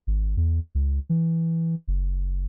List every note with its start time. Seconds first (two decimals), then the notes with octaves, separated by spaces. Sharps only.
0.07 G#1
0.37 E2
0.75 C#2
1.09 E3
1.88 F#1